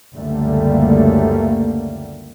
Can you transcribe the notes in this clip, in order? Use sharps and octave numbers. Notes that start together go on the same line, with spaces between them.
F#1 C#2 D3 G3 A3 A#3